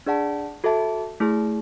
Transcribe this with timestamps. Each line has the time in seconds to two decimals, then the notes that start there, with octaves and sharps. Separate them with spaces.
0.06 D4 G#4 D5 F#5 A5
0.64 F#4 A4 E5 A5
1.20 A3 E4 G#4